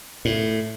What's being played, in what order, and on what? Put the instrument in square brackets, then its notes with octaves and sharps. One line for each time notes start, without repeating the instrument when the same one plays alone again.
[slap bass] A2